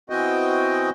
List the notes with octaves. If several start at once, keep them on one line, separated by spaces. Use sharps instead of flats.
E3 B3 C4 F#4 D#5 G5